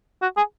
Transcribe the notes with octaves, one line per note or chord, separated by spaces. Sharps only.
F#4
G#4